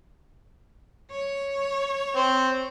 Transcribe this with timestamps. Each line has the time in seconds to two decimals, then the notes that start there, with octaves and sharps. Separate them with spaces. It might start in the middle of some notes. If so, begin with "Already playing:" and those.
1.11 C#5
2.16 C4